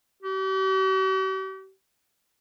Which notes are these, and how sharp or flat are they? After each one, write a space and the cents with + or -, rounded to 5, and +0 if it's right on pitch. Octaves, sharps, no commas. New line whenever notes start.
G4 -45